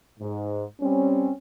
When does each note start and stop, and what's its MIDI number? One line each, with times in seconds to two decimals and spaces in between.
0.19 0.63 44
0.80 1.30 55
0.80 1.30 60
0.80 1.30 61